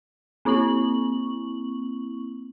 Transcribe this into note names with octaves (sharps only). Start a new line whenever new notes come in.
A#3 C4 E4 C#6 F#7